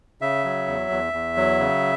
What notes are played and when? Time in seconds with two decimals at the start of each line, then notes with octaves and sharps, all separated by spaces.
0.21 C#3 E5
0.44 F#3
0.67 E2
0.91 E2
1.13 E2
1.37 F#3
1.59 C#3